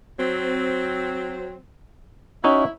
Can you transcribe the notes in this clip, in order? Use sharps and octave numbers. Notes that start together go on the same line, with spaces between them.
F#3 C4
C#4 D#4 E4 F#4